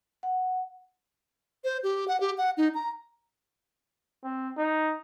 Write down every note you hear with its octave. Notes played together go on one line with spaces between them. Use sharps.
F#5
C5
G4
F#5
G4
F#5
D#4
A#5
C4
D#4